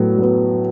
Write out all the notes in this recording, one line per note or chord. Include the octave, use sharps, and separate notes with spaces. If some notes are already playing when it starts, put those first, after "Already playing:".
Already playing: A2 F#3 B3
F#3 B3